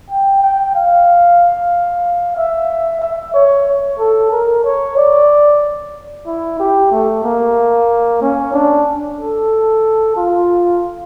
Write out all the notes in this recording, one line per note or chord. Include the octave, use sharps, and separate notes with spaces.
G5
G5
F5
E5
E5
C#5
A4
A#4
C#5
D5
E4
G4
A3
A#3
C#4
D4
A4
F4